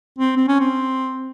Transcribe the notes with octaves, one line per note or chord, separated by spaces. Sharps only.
C4
C4
C#4
C4